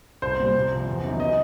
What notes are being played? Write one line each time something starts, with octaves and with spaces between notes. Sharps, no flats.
C2 C5
A#2 G3
C2
C3 F3
E2
C3 D#3 F#3 B3
D#5